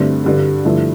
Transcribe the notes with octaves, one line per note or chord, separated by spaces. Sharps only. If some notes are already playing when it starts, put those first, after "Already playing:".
Already playing: G2 D3 A3 C4
G2 D3 G3
G2 D3 F3 A3 E4